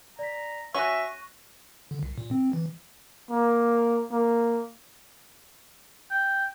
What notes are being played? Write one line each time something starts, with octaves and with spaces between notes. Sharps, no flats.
D5 A#5 B6
C#4 F#4 E5 C#6 F#6 A#6 D#7
D3
C2
A#2
C4
E3
A#3
A#3
G5